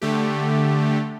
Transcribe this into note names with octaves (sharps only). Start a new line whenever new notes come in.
D3 A3 G4